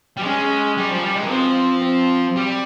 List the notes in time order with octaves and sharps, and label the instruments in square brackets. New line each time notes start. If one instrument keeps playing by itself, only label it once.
[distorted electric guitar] G3
[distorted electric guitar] G#3 [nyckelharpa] C#4
[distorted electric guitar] G3
F3
G3
G#3
D#3
[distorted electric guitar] F3 [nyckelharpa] C4
[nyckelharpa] C4
[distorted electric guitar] G3